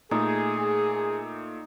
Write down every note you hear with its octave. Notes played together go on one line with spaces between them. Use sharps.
A#2 A3 D#4 G#4